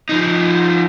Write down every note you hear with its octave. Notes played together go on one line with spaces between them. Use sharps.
F3 D#4